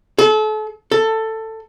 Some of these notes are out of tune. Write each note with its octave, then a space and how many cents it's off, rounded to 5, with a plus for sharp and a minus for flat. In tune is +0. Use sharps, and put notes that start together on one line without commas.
A4 -35
A4 +15